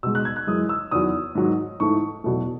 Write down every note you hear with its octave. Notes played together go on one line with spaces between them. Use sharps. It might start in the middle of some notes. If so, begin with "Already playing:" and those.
B2 G#3 E6
F#6
G#6
F#6
F#2 E3 G#3 D#6
E6
E2 D#3 F#3 D#6
G#2 D#3 F#3
G#2 E3 A3 C#6
E2 B2 F#3 A3